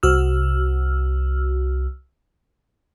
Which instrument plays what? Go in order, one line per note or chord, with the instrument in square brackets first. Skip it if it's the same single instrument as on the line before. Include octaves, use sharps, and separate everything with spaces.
[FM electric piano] C2 F#4 E6 F6